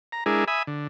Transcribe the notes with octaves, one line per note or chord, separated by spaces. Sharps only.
A#5
G#3 D4 E4 G#4 A#4
E5 G#5 B5 D#6
D3